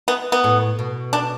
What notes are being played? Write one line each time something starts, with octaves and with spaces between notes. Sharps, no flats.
B3
B3
A2
B2
D4